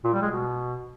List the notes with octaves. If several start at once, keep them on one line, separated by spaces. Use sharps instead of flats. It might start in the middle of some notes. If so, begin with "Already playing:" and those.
A#2
G3
G#3
B2